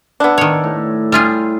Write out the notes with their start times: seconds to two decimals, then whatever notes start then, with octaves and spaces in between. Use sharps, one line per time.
0.20 B3 D4 E4
0.38 D#3 C#5
0.64 A2
1.12 G3 F4 G#4